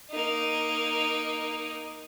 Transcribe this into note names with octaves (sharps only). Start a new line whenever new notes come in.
A#3 D#4